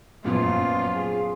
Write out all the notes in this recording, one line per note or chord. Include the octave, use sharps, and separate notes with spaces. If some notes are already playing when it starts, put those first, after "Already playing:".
F#2 A#2 F3 F#3 B3 F4
G#4